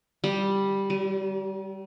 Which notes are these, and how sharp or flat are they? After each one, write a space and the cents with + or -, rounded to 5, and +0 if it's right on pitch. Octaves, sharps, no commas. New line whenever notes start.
G3 +0
G3 -40